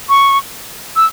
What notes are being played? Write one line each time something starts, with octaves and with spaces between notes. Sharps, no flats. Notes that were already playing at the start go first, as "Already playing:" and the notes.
C#6
E6